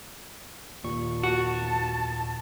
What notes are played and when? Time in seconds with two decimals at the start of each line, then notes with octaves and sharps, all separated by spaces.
0.84 D#2 A#2 C#6
1.24 F#4 A5